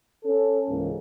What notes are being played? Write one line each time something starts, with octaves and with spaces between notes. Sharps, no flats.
C#4 A4
C#2 G#2 C#3 E3 A#3